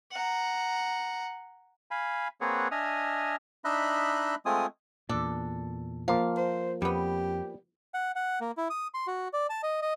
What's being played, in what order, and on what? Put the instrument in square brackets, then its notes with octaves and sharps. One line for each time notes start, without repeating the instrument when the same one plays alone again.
[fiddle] F#5 A#5
[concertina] F5 G#5 B5
A#3 C4 G#4 B4 C#5 F#5
D4 D#5 E5 G#5 D#6 F6
D4 D#4 D#5 E5 B5 F#6
G#3 A3 C4 F4 G#5 D#6
[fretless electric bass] E2 A#2 [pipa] D4 A4
[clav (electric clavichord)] F3 A#3 [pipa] F5
[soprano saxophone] C5
[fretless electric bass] F2 [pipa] G3 B3 [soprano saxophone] G4
[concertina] F#5
F#5
A#3
E4
D#6
C6
F#4
D5
A5
D#5
D#5